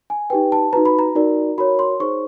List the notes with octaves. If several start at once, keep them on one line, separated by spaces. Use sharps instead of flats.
G#5
D#4 G4 B4 G5
A5
D#4 F#4 B4 A#5
B5
A#5
D#4 F#4 A#4 D5
F#4 A#4 C#5 B5
C6
D#4 G#4 C5 C#6